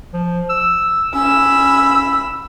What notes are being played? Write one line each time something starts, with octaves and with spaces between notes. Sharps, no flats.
F3
E6
C#4 B5 E6